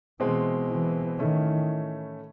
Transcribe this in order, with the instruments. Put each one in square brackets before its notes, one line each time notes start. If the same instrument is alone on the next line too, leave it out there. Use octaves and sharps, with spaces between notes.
[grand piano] B2 G#3 C4 [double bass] E3
[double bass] E3
[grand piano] A2 E3 A3 C#4 [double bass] D#3